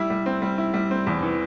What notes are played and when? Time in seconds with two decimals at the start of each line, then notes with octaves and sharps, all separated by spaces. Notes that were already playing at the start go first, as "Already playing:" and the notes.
Already playing: G3 E4
0.10 G3
0.26 C4
0.42 G3
0.58 E4
0.74 G3
0.91 C4
1.07 E2
1.22 E3